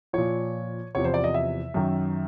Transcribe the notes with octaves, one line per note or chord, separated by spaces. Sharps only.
A#2 F3 C#5
E2 C3 F3 C#5
C5
D5
D#5
E5
F#2 D#3